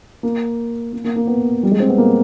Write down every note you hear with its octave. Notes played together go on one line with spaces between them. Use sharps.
A#3
A#3
A#3
A#3
B3
G3
G#3
C4
B3
A#3